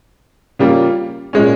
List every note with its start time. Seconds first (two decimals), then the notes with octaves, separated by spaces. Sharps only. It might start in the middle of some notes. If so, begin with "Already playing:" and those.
0.59 C#3 G3 A#3 F4
1.33 A#2 G#3 C#4